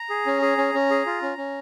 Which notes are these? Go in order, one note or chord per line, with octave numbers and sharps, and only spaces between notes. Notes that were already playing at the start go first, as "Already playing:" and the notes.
Already playing: A#5
G#4
C#4
G#4
C#4
C#4
G#4
F4
C#4
C#4